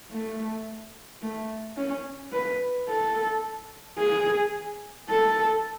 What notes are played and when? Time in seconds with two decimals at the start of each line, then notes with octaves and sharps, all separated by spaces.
0.11 A3
1.22 A3
1.77 C#4
2.32 B4
2.88 A4
3.99 G#4
5.10 A4